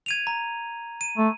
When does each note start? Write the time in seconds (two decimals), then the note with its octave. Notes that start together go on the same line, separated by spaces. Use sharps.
0.06 G#6 D#7 F7
0.27 A#5
1.01 D#7
1.18 A3